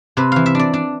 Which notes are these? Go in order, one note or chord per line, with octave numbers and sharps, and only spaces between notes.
C3 B4
E3 F5
E5
D4 D5
D4